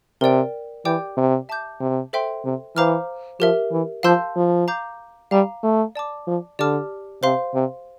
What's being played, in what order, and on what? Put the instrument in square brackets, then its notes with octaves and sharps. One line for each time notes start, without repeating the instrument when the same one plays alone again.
[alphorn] C3 [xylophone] A#4 D5 G5
[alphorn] E3 [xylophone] G4 D5 G5 D6 G6
[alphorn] C3
[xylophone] E5 A5 D6 G6
[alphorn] C3
[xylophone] A4 C5 E5 G5 C6
[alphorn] C3
[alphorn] E3 [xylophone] C5 F5 A#5 D6 F6
[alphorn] F3 [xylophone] G4 A#4 E5
[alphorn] E3
[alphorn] F3 [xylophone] F5 A5 C6 E6 G6
[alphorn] F3
[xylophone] F5 A#5 D6 G6
[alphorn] G3 [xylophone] F5 A#5 D6
[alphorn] A3
[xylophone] D5 A5 D6
[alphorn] F3
[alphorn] D3 [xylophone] G4 D5 A5 D6 F6
[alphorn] C3 [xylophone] C5 F5 C6
[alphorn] C3